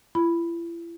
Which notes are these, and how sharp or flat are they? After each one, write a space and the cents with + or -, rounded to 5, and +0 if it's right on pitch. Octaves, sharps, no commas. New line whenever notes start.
E4 +40 B5 +0